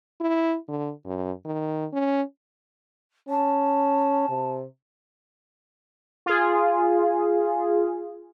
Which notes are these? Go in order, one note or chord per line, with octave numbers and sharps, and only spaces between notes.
E4
D3
F#2
D#3
C#4
C#4 A5
C3
F4 G#4